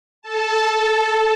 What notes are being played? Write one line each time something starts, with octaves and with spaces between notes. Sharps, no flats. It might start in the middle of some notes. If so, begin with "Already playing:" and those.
A4 A5